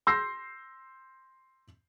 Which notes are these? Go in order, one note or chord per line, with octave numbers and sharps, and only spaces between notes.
C6 E6 G6 A#6 C7